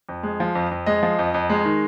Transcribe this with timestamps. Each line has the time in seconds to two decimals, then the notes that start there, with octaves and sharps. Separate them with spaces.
0.09 F2
0.23 G#3
0.40 F3
0.55 F2
0.71 F2
0.86 G#3 D#5
1.03 F3
1.19 F2
1.34 F2
1.50 G#3
1.65 D#3